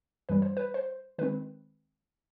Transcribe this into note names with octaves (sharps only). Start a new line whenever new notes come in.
G2 E3 G3 B4
C5
B4
C5
D#3 G#3 C4 B4